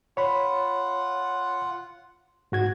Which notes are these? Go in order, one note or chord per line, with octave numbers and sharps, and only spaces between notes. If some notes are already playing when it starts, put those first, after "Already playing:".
F4 C#5 F#5 B5
G#2 F#4 G#6